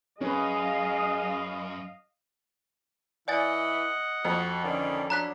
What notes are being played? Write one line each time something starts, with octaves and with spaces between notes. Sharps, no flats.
F#2 C#4 G#4 B4 D#5 F5
E3 D5 D#5 F#5 G#5 A6
F2 F#4
D3 D#3 C#4 D5
F#3 D4 A#5 F#6 B6